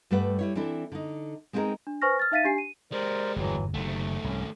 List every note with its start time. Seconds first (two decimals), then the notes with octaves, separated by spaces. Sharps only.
0.11 G2 G3 A3 B4 F#5
0.39 G3 E4 C#5
0.55 E3 C4 D4 E4 A4
0.92 D3 D#4
1.53 G#3 C4 D#4 E4 G#4 A#4
1.87 D4
2.02 B4 C5 G#5 C#6 F6 A#6
2.19 F6 A6
2.32 D#4 E5 F5 A6 B6 D#7
2.45 D4 G4 G#5 C7
2.58 D#7
2.92 G#3 G4 A#4 C5 D5
3.36 G1 E2 G#2 E3 F#3
3.74 F#1 C3 D#3 A3
4.24 C2 G#2 C#4